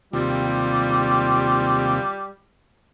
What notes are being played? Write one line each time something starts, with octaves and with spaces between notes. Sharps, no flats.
D#2 C3 G3 F4